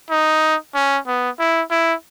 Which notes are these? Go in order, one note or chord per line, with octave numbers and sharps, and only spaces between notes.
D#4
C#4
B3
E4
E4